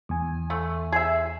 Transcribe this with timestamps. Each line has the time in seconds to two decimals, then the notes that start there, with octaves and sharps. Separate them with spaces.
0.09 E2 G#5
0.50 A3
0.92 G#4 E5